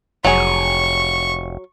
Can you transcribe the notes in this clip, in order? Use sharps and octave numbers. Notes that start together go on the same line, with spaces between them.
F1 F#3 G#4 C#6